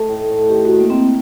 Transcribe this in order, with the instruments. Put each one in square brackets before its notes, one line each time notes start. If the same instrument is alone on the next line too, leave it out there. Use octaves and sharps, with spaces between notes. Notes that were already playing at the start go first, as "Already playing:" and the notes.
Already playing: [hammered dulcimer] A3 D#4
A2
A2
[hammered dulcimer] D#3 [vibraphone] G4
[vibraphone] F#4
[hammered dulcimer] D#3
[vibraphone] A#3
[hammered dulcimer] D#3 [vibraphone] A#3 C4